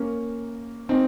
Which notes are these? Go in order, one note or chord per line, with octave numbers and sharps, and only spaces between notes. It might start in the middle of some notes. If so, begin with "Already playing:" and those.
Already playing: A#3 C#4
C4 D#4